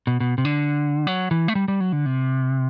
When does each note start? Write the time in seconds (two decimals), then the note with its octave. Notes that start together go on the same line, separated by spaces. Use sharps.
0.07 B2
0.20 B2
0.38 C3
0.45 D3
1.07 F#3
1.31 E3
1.48 A3
1.55 G3
1.68 G3
1.80 F#3
1.92 D3
2.06 C3